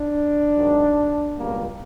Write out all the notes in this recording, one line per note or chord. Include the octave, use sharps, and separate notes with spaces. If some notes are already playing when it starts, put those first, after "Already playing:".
Already playing: D4
G#1 G#2 D#3 F#3
C#2 B2 G3 A#3